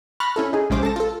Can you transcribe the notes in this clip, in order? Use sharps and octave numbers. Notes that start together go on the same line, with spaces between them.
B5 C#6 F6 F#6 A6 A#6
C#4 E4 A4
D#4 G#4
A#1 C3 G#3 C#4 C5 D6
A4 A5 A#6
F4 A4